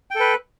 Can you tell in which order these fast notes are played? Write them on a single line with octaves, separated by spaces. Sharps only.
G5 A4 B4